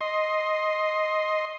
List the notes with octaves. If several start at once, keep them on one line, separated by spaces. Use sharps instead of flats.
D#5 C6